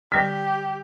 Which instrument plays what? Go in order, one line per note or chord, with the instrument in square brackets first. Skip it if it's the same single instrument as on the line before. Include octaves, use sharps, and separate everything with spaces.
[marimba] D3 G3 [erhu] G4 [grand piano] B6